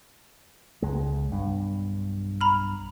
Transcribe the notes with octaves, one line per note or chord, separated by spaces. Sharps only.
C#2 G#3
B1 G2
A#5 B5 F6